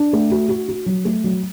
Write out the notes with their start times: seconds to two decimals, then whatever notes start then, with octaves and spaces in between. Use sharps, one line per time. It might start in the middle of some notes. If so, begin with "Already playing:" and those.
Already playing: D4
0.13 A3
0.31 F#4
0.49 F#4
0.68 F#4
0.86 F#3
1.05 A3
1.24 F#3